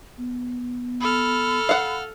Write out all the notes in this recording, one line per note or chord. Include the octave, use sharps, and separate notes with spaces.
B3
A4 B5 F6
F5 F#5